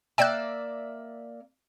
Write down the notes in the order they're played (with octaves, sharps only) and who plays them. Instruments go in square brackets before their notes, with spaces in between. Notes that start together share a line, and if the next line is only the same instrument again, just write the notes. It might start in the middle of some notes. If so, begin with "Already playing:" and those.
[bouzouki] A#3 D5 E5 [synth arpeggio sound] G5 F#6